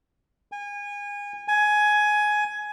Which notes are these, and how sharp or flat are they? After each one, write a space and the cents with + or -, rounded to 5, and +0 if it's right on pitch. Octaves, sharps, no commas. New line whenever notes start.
G#5 -30
G#5 +15